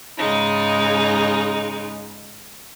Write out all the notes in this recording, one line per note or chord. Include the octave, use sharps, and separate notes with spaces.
G#2 C#3 G#3 D#4